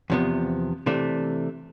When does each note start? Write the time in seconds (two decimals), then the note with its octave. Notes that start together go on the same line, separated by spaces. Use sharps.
0.10 E2 C3 F3 B3
0.86 C3 E3 A3 D4